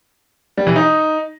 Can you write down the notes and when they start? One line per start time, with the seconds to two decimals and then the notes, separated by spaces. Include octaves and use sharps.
0.57 G3
0.67 E3
0.76 D#4